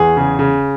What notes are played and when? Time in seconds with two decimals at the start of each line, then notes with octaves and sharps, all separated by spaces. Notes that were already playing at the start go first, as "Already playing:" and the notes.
Already playing: E2 G#4
0.17 C#3
0.39 C#3